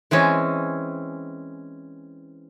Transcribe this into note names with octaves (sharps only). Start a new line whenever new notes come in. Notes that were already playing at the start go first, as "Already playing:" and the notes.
E3 G#3 C4 C#4